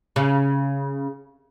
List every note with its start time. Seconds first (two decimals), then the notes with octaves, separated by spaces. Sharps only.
0.16 C#3